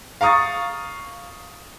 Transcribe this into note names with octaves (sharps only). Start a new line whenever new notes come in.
F5 A#5 C#6 D#6 A6